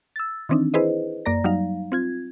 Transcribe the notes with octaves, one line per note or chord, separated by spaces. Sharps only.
E6 A6
D#3 E3 C4 D4 D#4
E4 G#4 B4 C5 D#5
F#2 A#3 D5 A#5 A#6
F#3 G3 D#4 F5
C4 F4 G#6